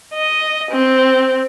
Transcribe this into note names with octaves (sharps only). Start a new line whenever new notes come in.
D#5
C4